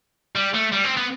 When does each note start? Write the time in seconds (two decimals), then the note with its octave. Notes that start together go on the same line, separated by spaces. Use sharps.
0.35 G3
0.54 A3
0.72 G3
0.84 C4
0.96 B3